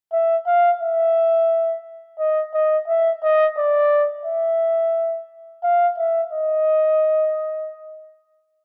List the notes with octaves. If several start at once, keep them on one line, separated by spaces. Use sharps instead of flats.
E5
F5
E5
D#5
D#5
E5
D#5
D5
E5
F5
E5
D#5